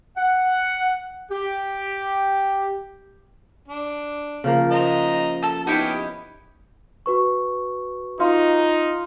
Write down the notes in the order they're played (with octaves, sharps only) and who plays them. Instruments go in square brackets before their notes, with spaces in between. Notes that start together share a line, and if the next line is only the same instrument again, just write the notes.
[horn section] F#5
G4
[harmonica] D4
[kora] C#3 F3 A#3
[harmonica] C5 D#5 A#5
[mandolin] A4 A5
[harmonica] B3 C#4 G4 [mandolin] D#4 E4
[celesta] F#4 B4 C#6
[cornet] D#4 [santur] F4